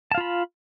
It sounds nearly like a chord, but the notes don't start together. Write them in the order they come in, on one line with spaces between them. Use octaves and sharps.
A5 F5 F4 B5